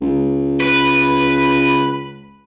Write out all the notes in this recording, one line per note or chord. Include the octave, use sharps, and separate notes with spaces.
C#2
B4